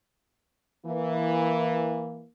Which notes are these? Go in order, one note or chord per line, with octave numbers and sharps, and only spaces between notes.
E3 A#3